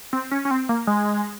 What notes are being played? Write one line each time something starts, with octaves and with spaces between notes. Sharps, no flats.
C4
C#4
C#4
C4
A#3
G#3